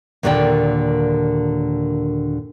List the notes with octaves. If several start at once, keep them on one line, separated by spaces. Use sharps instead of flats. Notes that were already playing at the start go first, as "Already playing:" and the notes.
D#2 A#2 D3 A#3 D5 G5